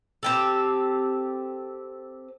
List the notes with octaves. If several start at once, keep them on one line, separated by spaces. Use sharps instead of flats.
C4 G4 A4